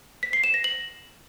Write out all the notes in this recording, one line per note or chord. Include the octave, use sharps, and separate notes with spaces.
B6
C7
E7
A#6
F#7